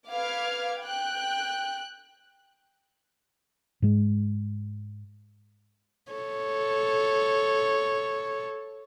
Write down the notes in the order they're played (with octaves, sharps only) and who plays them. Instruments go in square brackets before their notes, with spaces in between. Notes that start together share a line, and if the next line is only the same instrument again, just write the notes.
[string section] B4 F5 D6 F6 G#6
G5 F#6
[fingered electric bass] G#2 G#3
[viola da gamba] A4 C#5